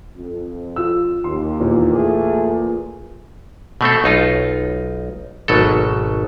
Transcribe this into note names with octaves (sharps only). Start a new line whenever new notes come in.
F2
F4 E6
D#2 C6
E2 A#2
A3 G#4
B2 A3 C4 A4
B1 D#4 F4
G#1 B2 F#3 A4